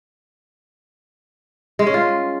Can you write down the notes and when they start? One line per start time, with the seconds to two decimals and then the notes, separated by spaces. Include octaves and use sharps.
1.79 G#3
1.87 C#4
1.94 F4